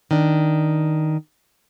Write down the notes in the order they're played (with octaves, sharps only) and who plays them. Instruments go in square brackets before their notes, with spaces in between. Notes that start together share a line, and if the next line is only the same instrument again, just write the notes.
[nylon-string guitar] D#3 D4